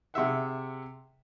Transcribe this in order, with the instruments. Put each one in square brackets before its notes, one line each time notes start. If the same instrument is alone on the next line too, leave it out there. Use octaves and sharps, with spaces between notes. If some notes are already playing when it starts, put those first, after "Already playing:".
[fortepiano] C3 G#4 E5 F#5